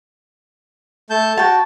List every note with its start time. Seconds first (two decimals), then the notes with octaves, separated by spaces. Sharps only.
1.10 A3 A5 G6
1.37 F#4 G5 A5